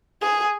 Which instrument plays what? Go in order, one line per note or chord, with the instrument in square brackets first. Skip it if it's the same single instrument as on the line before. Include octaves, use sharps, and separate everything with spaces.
[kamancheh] G#4